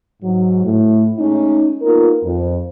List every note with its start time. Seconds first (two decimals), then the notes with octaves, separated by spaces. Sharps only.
0.23 G#2 F#3
0.65 A2
1.18 G#3 A3 C#4 D#4
1.82 A#3 B3 D#4 F4 A#4
2.24 F2